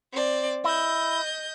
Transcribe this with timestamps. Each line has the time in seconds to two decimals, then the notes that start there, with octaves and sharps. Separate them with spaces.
0.12 C4 D5
0.64 E4 D#5 G6